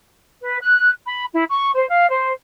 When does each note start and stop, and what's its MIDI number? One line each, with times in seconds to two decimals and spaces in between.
0.40 0.59 71
0.61 0.90 90
1.05 1.24 83
1.33 1.43 64
1.49 1.70 85
1.74 1.87 72
1.88 2.08 77
2.10 2.31 72